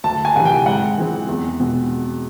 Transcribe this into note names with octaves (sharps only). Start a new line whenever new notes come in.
D2 A5
G#5
C3 E3 F#5
G5
G#2 F#5
E3 G#3 C4
E2
B2 G#3 C4